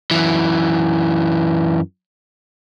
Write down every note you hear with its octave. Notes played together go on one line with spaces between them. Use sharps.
F#2 E3